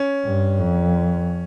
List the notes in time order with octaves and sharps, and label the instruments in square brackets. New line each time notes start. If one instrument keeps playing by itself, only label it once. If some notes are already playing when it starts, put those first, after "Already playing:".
Already playing: [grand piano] C#4
[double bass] G2
F2